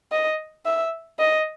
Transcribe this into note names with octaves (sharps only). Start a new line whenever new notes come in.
D#5
E5
D#5